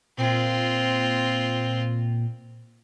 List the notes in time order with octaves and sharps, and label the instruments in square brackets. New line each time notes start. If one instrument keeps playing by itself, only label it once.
[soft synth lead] A#2 [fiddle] C4 F4